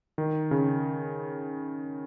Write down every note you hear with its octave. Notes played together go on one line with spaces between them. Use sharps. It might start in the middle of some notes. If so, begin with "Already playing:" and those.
D#3
C#3